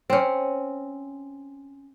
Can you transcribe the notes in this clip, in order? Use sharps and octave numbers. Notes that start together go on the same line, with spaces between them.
C4 C#4